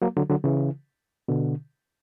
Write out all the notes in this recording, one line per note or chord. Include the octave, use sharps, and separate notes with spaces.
F#3 A#3
D3 F#3
D3 F#3
C#3 E3
B2 D3